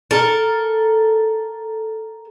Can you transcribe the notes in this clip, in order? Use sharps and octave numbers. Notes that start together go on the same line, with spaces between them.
A4 A#4